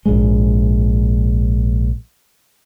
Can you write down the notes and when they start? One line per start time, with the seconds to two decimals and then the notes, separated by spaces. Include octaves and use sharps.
0.06 A#1 G#2 G#3